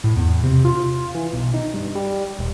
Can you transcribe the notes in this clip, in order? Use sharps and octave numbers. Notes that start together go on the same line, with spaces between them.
A2
E2
C3
F4
F4
E3
B1
D#3
G2
G3
D#1